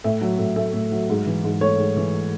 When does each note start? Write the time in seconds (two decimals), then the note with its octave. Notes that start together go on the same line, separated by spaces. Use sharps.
0.04 A2 E5
0.21 F#3
0.39 A2
0.56 A3 E5
0.73 A2
0.92 F#3
1.09 G#2
1.26 E3
1.44 G#2
1.61 A3 C#5
1.78 G#2
1.97 E3